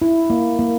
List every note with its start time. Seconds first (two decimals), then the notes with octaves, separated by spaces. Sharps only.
0.02 E4
0.30 A#3
0.59 A#3